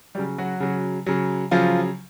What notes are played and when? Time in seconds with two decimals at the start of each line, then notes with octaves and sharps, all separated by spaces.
0.15 C#3 F#3 G3 G4
0.38 F#3 F#4
0.60 C#3 F#3
1.06 C#3 F#3
1.51 C#3 F3 F#3 F4